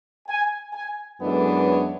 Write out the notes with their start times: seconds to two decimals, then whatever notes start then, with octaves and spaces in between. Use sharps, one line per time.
0.28 G#5
0.74 G#5
1.21 F#2 E3 G#3 B3 D4 A4
1.66 C#5